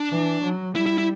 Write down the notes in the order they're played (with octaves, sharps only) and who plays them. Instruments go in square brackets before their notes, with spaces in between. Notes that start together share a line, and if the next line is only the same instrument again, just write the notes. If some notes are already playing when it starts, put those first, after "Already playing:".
Already playing: [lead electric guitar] D4
[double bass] E3
F#3
[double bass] G3 [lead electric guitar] E4
[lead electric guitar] E4
E4